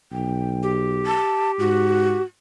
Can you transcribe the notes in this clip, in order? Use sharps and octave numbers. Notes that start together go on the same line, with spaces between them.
B1 G5
G4
A5
G#2 F#4